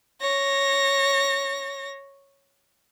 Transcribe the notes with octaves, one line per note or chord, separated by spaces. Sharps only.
C#5 A#6